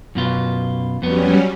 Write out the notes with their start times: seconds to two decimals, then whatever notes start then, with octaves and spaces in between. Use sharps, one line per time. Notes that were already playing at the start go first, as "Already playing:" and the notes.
0.15 F#2 B2 F4
1.02 F2 F#3 G3 B3 C#4